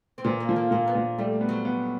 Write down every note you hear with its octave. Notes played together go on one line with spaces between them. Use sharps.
C4
A#2 B3
A#3
F3
A#3
A#2 A#3
B3
A#2
G3 A3
B3
F#3
B3